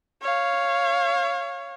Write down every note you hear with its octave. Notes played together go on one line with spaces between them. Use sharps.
C#5 F5